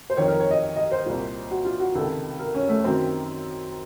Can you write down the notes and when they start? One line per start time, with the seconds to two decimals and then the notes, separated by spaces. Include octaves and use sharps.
0.10 C5
0.17 F2 D#3 C#5
0.28 A#4
0.40 C#5
0.51 D#5
0.76 D#5
0.91 C5
1.06 C2 A#2
1.51 F#4
1.65 F4
1.80 F#4
1.95 C#2 C3 D#3 A4
2.39 A#4
2.55 C#4
2.69 A3
2.84 F#2 D#3 C4